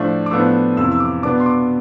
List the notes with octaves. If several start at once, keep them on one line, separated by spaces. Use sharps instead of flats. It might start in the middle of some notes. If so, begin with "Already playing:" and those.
Already playing: A2 F3 A3 D4
D6
A2 F3 B3 D4 E6
F2 C3 E3 E6
E6
D6
B2 B3 D4 D6
C6
D6